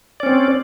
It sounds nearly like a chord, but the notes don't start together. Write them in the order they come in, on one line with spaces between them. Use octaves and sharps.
D5 C#4 C4